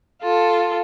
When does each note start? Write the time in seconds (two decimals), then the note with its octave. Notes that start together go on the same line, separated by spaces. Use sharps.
0.21 F4 A4